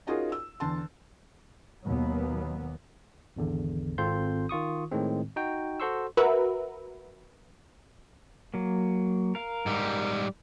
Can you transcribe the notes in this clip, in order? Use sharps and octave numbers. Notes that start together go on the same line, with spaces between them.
C#4 D#4 F4 F#4 G#4 A#4
E6
E2 D3 A5 C6
D#2 B2 F#3 A#3 B3
G#1 E2 D3
G#1 C4 F4 A4 C6 G6
D#3 F4 C#6 D#6
A2 D#3 G#3 C4
D#4 F#4 G5
F#4 A4 C5 C6 C#6 E6
F#4 A#4 B4 E5
F#3 A#3
A#4 F5
G#2 G3